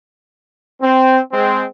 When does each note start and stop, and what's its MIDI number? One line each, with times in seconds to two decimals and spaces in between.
0.82 1.19 60
1.32 1.63 56
1.32 1.63 60